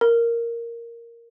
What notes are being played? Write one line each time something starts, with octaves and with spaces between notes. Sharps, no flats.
A#4